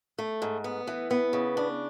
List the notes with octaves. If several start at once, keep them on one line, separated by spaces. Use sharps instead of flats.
A3
G#2
B3
E3
B3
C#3
D4